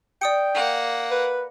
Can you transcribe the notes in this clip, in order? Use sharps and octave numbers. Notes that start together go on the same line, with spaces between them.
D5 G5 D#6 C#7
A#3 F#5
B4